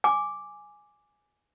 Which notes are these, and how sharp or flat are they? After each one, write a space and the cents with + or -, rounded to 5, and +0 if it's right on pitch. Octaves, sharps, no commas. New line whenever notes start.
G#5 +0 D6 +0